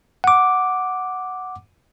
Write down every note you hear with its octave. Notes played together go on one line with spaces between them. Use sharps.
F#5 D6